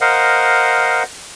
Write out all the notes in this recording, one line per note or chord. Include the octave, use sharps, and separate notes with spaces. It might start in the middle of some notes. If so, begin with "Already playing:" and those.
A#4 C5 D#5 F5 F#5